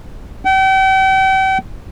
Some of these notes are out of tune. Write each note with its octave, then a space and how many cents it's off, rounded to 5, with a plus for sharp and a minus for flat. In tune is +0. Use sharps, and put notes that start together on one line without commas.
G5 -40